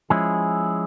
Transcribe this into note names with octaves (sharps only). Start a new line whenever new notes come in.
F3 G#3 C#4 E4 G#4